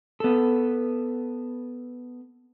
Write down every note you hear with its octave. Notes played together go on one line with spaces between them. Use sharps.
B3 A4